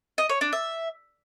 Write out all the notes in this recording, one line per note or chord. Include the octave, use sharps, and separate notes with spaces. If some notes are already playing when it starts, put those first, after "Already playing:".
D#5
C#5
D4
E5